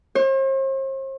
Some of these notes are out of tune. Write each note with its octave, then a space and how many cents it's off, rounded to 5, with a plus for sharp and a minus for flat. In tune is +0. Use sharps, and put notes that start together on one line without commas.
C5 +45